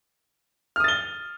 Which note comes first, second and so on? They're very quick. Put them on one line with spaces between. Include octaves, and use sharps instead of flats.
F6 D#6 A6 G7